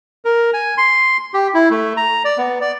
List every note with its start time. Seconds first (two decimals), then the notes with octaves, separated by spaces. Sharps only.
0.25 A#4
0.53 G#5
0.78 C6
1.34 G4
1.54 E4
1.71 A3
1.97 A#5
2.25 D5
2.38 B3
2.61 D5